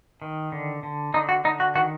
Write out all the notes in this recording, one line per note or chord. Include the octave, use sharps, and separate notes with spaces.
D#3
D3
D3
D3 D#4
F#4
D3 D#4
F#4
D#3 F#4